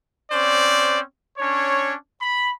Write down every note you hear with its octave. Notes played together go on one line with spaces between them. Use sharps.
C4 C#4 C5 D5
C#4 D4 C#5
B5